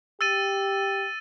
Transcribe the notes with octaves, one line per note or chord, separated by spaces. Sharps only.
G4 E6 A6 D#7